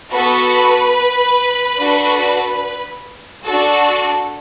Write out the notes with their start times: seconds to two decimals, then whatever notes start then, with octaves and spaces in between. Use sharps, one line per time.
0.11 B3 F#4 A4 B4
1.79 D4 F#4 A4
3.45 D4 F#4 A4